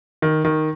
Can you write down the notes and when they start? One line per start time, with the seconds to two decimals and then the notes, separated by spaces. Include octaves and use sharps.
0.22 D#3
0.45 D#3